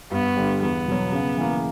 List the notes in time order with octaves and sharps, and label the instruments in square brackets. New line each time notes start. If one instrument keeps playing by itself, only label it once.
[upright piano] G2 [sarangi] B3
[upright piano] D3 G3
[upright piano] E2 [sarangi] B3
[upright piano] B2 F#3
C#3
E3 A#3